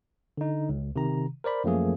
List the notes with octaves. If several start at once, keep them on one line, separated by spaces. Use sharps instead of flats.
D3 D#4
C#2
C3 D#3 A#5
A#4 C5 D5 B5
F#2 F3 A3 A#3 G#4